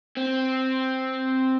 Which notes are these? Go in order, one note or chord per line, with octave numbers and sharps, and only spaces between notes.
C4